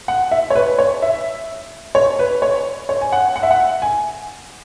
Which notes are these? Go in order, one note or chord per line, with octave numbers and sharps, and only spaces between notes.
F#5
E5
C#5
B4
C#5
E5
C#5
B4
C#5
C#5
G#5
F#5
F#5
E5
F#5
G#5